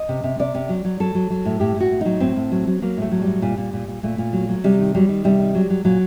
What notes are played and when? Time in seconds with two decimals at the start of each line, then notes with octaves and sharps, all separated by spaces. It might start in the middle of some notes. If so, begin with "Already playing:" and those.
Already playing: D#5
0.09 C3
0.24 C3
0.39 C3 D5
0.55 C3
0.69 F#3
0.85 F#3
1.00 F#3 A4
1.15 F#3
1.30 F#3
1.45 A2
1.60 A2 G4
1.76 A2 F#4
1.91 A2
2.01 F#3 D#4
2.20 A2 C4
2.36 A2
2.52 F#3
2.67 F#3
2.82 F#3 A#3
2.97 A2 A3
3.11 F#3
3.22 G3
3.27 A2
3.42 A#2 G3
3.58 A#2
3.73 A#2
3.87 A#2
4.03 A#2 A3
4.18 A#2
4.33 F#3
4.49 F#3
4.64 C3 G3
4.79 D#3
4.95 F#3 G3
5.09 D#3
5.24 C3 G3
5.39 D#3
5.55 F#3
5.70 F#3
5.85 A#2 F#3